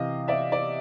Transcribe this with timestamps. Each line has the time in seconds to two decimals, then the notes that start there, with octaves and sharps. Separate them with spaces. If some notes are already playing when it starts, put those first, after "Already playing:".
Already playing: C3 E3 D#5 F5
0.28 D5 E5
0.52 D5